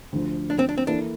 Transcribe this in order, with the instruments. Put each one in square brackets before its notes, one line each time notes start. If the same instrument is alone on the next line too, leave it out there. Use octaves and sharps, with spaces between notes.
[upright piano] D2 D3 F3
[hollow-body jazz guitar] D4
C4
D4
C4
[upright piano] E3 A#3 E4 A4 [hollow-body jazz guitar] D4